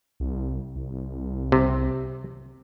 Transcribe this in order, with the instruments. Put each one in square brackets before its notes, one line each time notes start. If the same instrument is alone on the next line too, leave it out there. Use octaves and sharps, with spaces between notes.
[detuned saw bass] C2
C2
[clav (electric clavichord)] C3